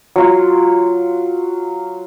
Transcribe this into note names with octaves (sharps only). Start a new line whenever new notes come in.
F#3 F4